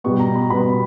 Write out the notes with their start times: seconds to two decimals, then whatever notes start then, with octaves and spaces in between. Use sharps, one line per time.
0.04 B2 G3 B3 C#6
0.20 A#5
0.35 B5
0.50 B2 G3 B3 B5